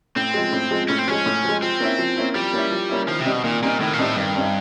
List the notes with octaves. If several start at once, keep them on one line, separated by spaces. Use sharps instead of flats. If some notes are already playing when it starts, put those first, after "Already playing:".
A2 C4
F3 G#3
A2
F3 G#3
A2 C#4
C4
F3 G#3 C#4
A2
F3 G#3
F3 C4
A#3 C#4 E4
F3
A#3 C#4 E4
F3 G3
A#3 C#4 E4
F3
A#3 C#4 E4
D#3 F3
C3
G3 C4 D#4
B2
A#2 D#3
A#2 G3 C4 D#4
A2 D#3
A#2
A2 G3 C4 D#4
G2 D#3
G3 C4 D#4